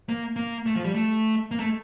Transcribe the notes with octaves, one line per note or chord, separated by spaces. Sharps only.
A#3
A#3
A3
F3
G3
A3
A#3
A3